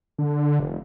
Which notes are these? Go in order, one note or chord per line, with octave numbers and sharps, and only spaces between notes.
D3
F1